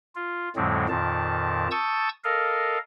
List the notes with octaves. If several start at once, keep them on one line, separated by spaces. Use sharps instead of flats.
F4
F2 A2 D3 F#3 G#3 C4
F2 A#2 D#3 A5
A5 C#6 D#6 E6 G6 A6
A4 A#4 D#5 F5